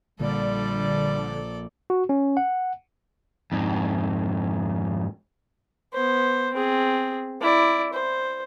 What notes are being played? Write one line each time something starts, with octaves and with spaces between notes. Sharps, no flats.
A#1 A#2 D3 G3 A4 D5
F#4
C#4
F#5
F2 G#2
B3 C5
C4 G#4
E4 D5
C5